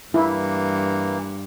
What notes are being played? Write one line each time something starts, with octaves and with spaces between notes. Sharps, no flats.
G2 E3 A#3 E4